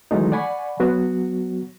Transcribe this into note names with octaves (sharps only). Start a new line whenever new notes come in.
D#3 E3 F#3 G#3 A3 D#4
D5 F#5 G#5 B5 C#6
F#3 B3 F#4